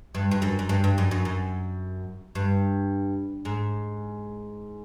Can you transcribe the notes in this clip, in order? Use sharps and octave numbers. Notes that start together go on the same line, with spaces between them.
G2
G2
F#2
F#2
G2
G2
F#2
F#2
F#2
G2
G#2